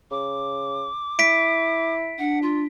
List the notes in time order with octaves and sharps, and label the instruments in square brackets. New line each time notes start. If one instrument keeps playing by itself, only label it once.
[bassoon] C#3 [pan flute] D6
[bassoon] E4 [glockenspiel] B6 D7
[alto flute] D4 [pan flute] F#5
[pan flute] F4